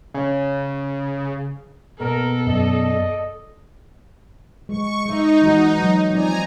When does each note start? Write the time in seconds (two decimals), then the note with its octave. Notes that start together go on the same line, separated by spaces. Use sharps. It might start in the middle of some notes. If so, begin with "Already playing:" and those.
0.14 C#3
2.00 B2 A#3 A4 A#4
2.47 F#2 D5 D#5
4.69 G#3 C#6
5.06 G#3 D#4 E5
5.42 E3 G#3 F#4
5.78 F#3
6.11 F3 C4 D5 G#5 A#5